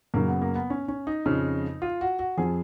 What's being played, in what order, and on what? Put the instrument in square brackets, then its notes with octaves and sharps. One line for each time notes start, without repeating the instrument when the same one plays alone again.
[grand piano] F#2 C#3 F#3 A#3
B3
A#3
B3
C#4
C#4
D#4
F2 C#3 F3
F4
F#4
F#4
F2 F3 G#4